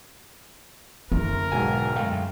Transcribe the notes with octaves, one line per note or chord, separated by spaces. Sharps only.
F#1 D3 C#4 A#4
E1 B1 G#2 G#5
F#2 G#3 A3 F5 G5